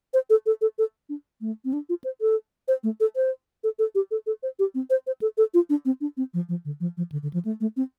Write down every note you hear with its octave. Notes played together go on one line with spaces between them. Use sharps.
C5
A4
A4
A4
A4
D4
A3
C4
D4
F4
C5
A4
C5
A3
A4
C5
A4
A4
G4
A4
A4
C5
G4
C4
C5
C5
A4
A4
F4
D4
C4
D4
C4
F3
F3
D3
F3
F3
D3
D3
F3
A3
A3
C4